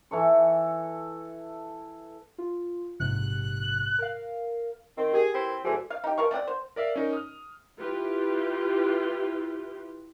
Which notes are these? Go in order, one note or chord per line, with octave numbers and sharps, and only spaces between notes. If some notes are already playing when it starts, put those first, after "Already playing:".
E3 A4 C#6
F4
A#1 G#2 C3 F#6
A#4 F5
D#3 C4
G4 G#4 A#4
C4 E4 B4 C5
A#2 E3 G3 F#4 G#4 A4 C5
F5
D#4 G4
B2 A#4 F5 C#6
A3 C4 D5 F#5
C5
A#4 D5 E5 F5
C#4 D#4 A#4
D#6 F6
E4 F4 G4 B4